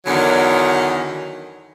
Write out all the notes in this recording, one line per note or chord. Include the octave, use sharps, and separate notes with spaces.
E2 D3 D#3 F#3